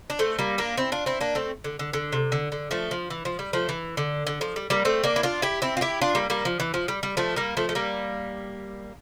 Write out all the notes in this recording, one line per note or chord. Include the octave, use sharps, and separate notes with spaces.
D4
A3 C4
G3 A#3
A#3 D4
C4 E4
D4 F4
C4 E4
A#3 D4
A3 C4
D3
D3
D3
C3
D3
D3
F3 A3
F3
E3
F3
G3
F3 A3
E3
D3
D3
F3
G3
G3 A#3
A3 C4
A#3 D4
E4
D4 F4
E4 G4
C4 E4
F4
E4 G4
D4 F4
G3 A#3
G3 A#3
F3
E3
F3
G3
G3
F3 A3
G3 A#3
F3 A3
A3
G3 A#3